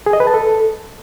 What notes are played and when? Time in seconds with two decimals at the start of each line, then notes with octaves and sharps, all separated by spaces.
0.06 G#4
0.13 D#5
0.20 B4
0.27 A5
0.34 A4